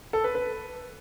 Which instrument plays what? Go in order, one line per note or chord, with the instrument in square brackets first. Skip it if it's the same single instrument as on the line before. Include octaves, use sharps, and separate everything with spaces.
[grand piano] A4
B4
B4